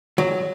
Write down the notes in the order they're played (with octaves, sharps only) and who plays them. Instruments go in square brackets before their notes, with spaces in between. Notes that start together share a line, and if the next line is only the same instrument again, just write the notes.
[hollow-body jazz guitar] F#3